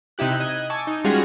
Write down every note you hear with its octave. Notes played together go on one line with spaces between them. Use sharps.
C3 D#4 E4 G4 F#6
D#5 D#6 F#6 G#6
G#5 A5 C#6 D6 E6
D#4
G3 G#3 C#4 F4 F#4 G#4